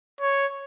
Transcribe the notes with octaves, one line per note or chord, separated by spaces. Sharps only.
C#5